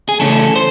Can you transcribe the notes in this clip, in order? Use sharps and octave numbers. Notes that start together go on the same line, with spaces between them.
G#4
C#3 E3 A3 C#4 A4
C5